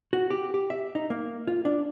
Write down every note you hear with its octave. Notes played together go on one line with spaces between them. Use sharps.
F#4
G4
G4
E5
D#4
A#3
F4
D4